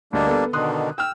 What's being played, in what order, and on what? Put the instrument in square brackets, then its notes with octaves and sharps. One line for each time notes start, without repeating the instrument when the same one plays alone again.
[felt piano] D2 D#5 [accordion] G3 A#3 D4
[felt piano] B3 A4
[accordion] B2 D3 D#3 [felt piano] C6 D#6 F#6
[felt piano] G5 F6 [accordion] E6